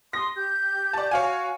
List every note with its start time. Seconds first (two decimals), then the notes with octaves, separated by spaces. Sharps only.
0.13 C6 D#6 A#6
0.35 G4 G6
0.93 D5 A5
1.11 F#4 C#5 F5 G#5